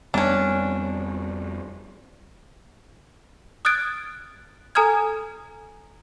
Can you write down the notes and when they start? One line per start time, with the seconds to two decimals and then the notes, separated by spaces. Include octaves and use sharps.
0.14 F2 G3 B3 C#4 D4
3.65 D#6 F6 F#6 G#6 A6 D7
4.75 A4 G#5 A#5 D#6 F6 G#6